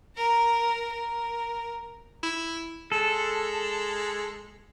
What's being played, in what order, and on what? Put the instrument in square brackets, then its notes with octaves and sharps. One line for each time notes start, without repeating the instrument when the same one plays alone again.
[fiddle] A#4 A#5
A#4
[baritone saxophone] E4
[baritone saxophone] G#3 [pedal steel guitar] A4